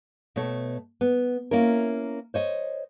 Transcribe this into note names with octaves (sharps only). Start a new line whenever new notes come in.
B2 A3 C#5
B3
A#3 C#4 E4 A#4
C5 C#5 D#5